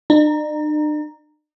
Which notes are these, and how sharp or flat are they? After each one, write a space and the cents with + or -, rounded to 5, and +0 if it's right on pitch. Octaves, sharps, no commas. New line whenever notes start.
D4 +45 A#5 +0